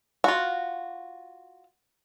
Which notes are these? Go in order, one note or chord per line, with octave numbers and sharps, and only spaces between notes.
F4 F#4